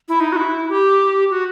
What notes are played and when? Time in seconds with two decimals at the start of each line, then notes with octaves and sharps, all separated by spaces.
0.09 E4
0.20 D#4
0.32 F#4
0.36 E4
0.70 G4
1.31 F#4